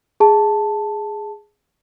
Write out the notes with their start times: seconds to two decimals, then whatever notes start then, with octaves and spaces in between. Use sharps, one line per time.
0.20 G#4 A5